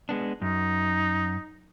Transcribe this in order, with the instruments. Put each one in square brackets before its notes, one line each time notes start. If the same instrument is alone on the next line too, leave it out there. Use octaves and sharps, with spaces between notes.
[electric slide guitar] G#3 B3 D4
[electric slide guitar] F#2 [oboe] D#4